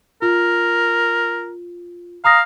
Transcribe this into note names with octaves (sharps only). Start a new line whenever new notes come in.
F4 A#4
F5 A#5 D#6 A#6